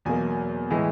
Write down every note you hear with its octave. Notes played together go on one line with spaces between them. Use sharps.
E2 B2 F#3 A#3 G#5
A2 E3 G#3